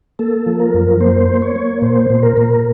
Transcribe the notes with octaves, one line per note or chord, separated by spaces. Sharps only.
A#3 A4
F3
A#4
F#2
A#3 C5
A#3
C#5
A#3
A#2 C5
A#2
A#4
A#2